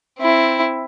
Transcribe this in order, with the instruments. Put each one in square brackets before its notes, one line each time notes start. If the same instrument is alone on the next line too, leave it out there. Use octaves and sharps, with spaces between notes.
[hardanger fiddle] C4 E4